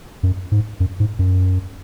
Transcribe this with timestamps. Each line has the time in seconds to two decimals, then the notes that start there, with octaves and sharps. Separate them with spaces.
0.23 F#2
0.52 G#2
0.80 F#2
1.00 G#2
1.19 F#2